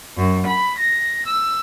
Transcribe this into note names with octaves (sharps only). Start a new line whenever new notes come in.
F#2
B5
A#6
E6